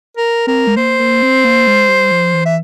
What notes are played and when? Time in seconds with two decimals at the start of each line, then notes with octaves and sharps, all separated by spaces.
0.17 A#4
0.47 C4 A#4
0.67 G#3
0.77 A#3 C5
0.99 A#3
1.22 C4
1.44 A#3
1.67 G#3
1.88 G3
2.11 F3
2.33 E3
2.46 E5